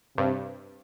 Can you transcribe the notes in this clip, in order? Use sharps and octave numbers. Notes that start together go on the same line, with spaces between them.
G2 C3